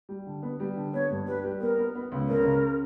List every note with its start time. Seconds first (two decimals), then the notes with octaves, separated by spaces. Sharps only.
0.09 G3
0.27 D3
0.43 B3
0.60 G3
0.76 D3
0.93 B3 C#5
1.11 G2
1.27 G3 B4
1.44 G3
1.60 B3 A#4
1.78 B3
1.95 B3
2.12 C#2
2.28 C#3 A#4
2.45 C#3